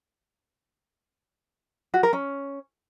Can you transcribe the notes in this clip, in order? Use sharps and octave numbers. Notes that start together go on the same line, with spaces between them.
F#4
A#4
C#4